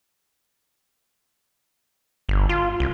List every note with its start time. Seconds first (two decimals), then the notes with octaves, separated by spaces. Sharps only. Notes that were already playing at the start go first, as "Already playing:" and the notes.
2.29 G1
2.49 F4
2.80 C2